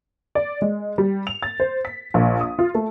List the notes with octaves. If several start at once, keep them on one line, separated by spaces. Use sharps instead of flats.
D5
G#3
G3
F7
A6
C5
B6
A#1
D#6
F4
A3